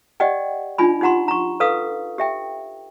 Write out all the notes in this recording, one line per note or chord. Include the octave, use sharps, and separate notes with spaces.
G4 D5 D#5 F#5 G5
D4 D#4 F4 G#5 B5
D#4 G4 F#5 A#5 C6
A#5 C#6
A4 B4 F5 D#6
G4 E5 G5